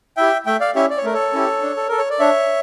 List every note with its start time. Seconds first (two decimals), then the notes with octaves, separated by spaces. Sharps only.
0.17 E4 G4 E5 G5
0.46 A3 E5 G5
0.60 D5 F5
0.75 C#4 E4 G4 C#5 E5
0.90 D5
0.98 C#5
1.04 A3 A#4
1.13 A4 C#5
1.33 C#4 E4 G4
1.62 D4
1.77 A4
1.88 A4 A#4
1.98 C#5
2.10 D5
2.19 D4 C#5 E5